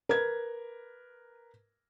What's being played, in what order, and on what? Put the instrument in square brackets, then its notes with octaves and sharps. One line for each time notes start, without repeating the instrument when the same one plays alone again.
[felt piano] A#4 B4 G#6